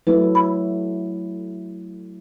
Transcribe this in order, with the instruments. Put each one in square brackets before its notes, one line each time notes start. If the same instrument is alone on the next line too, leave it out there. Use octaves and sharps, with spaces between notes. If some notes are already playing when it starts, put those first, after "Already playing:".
[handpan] F#3 A3 E4 [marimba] B4
[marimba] B5